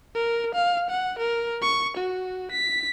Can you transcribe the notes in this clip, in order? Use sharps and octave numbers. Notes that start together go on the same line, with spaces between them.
A#4
F5
F#5
A#4
C#6
F#4
B6